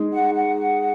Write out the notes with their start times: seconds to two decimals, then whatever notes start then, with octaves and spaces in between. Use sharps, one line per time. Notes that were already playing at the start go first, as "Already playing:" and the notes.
Already playing: G#3 D#4 G#4
0.14 F#5
0.34 F#5